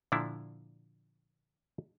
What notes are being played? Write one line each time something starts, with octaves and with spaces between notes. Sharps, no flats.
A#2 D3 F3 D4 E4